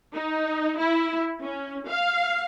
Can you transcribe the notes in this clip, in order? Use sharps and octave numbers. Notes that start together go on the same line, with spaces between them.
D#4
E4
C#4
F5